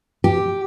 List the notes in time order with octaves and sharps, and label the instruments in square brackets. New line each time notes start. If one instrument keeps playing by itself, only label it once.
[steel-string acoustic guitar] G4